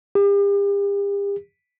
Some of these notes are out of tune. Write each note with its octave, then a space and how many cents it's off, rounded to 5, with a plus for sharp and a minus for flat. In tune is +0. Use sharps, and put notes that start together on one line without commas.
G4 +40